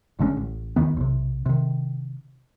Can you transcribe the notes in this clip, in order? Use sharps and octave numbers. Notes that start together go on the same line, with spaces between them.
G1 D3 G#3 C#4
A1
D#2 D#3 B3
B1 C3
C3 D#3